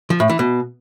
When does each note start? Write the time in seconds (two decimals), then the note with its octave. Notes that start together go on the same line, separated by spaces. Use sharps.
0.10 F3
0.20 A2
0.29 E3
0.39 B2